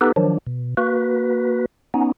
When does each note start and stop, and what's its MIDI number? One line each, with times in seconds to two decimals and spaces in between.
0.01 0.12 59
0.01 0.12 63
0.01 0.12 67
0.01 0.12 69
0.01 0.12 71
0.16 0.38 51
0.16 0.38 53
0.16 0.38 54
0.16 0.38 62
0.47 0.75 47
0.77 1.66 58
0.77 1.66 66
0.77 1.66 71
1.94 2.12 59
1.94 2.12 61
1.94 2.12 63